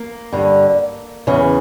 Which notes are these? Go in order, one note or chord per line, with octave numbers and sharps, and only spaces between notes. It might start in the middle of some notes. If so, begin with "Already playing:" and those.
Already playing: A#3
G2 D3
E2 C#3 E3